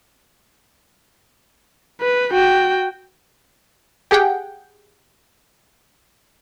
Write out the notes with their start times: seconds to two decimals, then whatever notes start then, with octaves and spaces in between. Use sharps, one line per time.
2.01 B4
2.33 F#4 G5
4.11 G4 G#4 F#5 G5